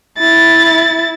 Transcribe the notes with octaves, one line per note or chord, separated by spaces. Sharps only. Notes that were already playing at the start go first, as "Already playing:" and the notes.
E4 A6